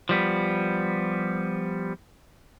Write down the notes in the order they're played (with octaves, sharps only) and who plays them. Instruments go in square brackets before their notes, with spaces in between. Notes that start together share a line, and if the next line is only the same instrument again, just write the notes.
[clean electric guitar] F3 G3 B3